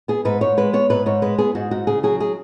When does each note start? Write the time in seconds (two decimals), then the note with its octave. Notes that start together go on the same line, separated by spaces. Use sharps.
0.08 B3 G#4
0.25 G#2 B4
0.41 G#2 C#5
0.57 G#3 B4
0.73 B3 C#5
0.90 G#2 B4
1.06 G#2 C#5
1.22 G#3 B4
1.38 B3 G#4
1.55 G#2 F#4
1.71 G#2 F#4
1.87 C#3 G#4
2.03 F#3 G#4
2.20 G#4